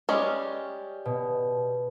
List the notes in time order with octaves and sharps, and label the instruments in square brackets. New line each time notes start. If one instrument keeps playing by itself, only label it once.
[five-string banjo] G3 G#3 C#4
[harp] B2